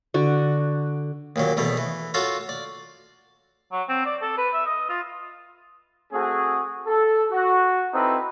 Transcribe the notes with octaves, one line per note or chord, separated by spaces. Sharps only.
D3 F#4
D#2 A#2 F#3
E2 B2 A3
E3
F4 F#4 A4 C#5
D5
F#3
C4
D5
A4
B4
E5
D#5
F4
A3 C4 F#4 G#4
A4
F#4
C4 D#4 E4 A4 B4